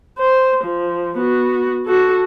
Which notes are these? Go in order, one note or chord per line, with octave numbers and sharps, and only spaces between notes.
C5
F3
B3 F#4
F#4 A4